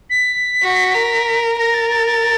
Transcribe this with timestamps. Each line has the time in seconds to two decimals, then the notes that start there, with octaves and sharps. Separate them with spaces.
0.10 B6
0.63 F#4
0.94 A#4
1.58 A#4 A#6
1.74 A6
1.90 A6
2.07 A6